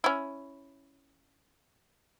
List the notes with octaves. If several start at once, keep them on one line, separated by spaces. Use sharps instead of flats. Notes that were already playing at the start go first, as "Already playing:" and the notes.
C#4 E4